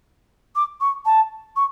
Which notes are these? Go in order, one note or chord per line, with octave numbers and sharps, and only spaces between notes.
D6
C#6
A5
C#6